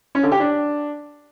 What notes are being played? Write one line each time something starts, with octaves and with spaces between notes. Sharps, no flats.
C#4
D3
G4
D4